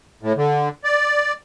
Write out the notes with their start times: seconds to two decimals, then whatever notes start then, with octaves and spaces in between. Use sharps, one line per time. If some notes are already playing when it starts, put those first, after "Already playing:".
0.22 A2
0.37 D3
0.84 D5